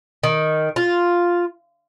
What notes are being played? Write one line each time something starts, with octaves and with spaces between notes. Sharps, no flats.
D#3
F4